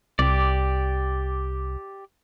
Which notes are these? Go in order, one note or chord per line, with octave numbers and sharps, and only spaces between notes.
C2 G4 D5